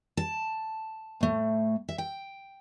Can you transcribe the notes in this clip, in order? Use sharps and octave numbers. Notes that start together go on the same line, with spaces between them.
A5
A2 A3
E5
G5